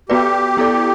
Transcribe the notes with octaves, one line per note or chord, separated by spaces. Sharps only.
B3 F#4 G4 B4 D5
B3 E4 A4 D5